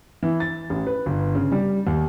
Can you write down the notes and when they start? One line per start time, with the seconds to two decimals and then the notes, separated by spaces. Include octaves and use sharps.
0.23 E3
0.40 A6
0.70 A1
0.87 B4
1.06 G1
1.35 C#3
1.52 G3
1.87 D#2